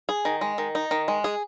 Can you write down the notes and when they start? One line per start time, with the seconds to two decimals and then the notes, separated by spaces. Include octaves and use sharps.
0.09 G#4
0.25 D#3
0.41 G#3
0.58 D#3
0.75 D#4
0.91 D#3
1.08 G#3
1.24 G#4